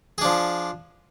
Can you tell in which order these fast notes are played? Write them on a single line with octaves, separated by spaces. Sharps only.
G#4 D4 F3